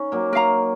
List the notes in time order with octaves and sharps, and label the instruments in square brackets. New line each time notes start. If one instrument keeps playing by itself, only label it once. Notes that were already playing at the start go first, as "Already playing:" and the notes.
Already playing: [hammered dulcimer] C#4 D#4
F#3 A#3
[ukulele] A#4 F5 A#5